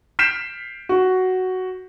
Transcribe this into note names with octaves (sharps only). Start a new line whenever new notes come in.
F6 G6 B6 C7 D7 E7
F#4